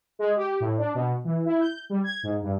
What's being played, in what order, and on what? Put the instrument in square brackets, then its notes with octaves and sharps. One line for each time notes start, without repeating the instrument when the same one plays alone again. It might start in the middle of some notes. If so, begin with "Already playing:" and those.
[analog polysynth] G#3
G4
A2
D4
B2
E3
E4
G6
G3
G#6
G#2
G2